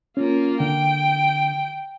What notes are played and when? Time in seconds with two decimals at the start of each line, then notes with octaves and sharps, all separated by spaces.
0.17 A#3 C#4 F4
0.60 D3 G5